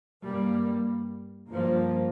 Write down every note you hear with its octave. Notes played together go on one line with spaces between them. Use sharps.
G2 G3 A#3
G2 F3 A#3